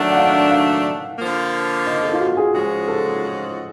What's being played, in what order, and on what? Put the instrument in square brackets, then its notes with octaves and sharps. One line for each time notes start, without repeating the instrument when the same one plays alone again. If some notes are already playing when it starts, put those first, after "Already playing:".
Already playing: [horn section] D#3 F#3 A3 D4 [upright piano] F#5
[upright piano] F#5
F5
F5
[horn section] D3 F3 A#3
[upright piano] D#5
A4
F4
F#4
G#4
[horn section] G#2 F3 G#3 C#4 F#4 [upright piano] G#4
[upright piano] A4